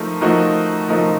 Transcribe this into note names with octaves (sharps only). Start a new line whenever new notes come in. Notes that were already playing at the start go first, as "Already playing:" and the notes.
Already playing: F3 A3 D#4 A#4
F3 A3 D#4 F#4 A#4
F3 A3 D#4 F#4 A#4